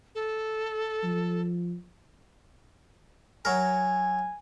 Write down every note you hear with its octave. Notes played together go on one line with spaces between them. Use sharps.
A4
F3
F#3 A#4 G#5